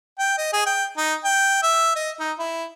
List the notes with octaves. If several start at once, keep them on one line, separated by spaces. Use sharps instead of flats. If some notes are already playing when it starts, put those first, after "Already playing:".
G5
D#5
G#4
G5
D#4
G5
E5
D#5
D#4
E4